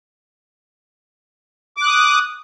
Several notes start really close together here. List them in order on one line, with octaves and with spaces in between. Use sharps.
D6 F#6 D#6